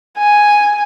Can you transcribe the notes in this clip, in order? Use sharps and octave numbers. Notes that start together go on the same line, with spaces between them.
G#5